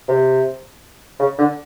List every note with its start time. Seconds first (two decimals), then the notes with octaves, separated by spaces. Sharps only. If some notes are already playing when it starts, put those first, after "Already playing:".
0.08 C3
1.20 C#3
1.38 D3